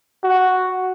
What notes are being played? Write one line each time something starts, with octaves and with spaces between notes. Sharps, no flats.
F#4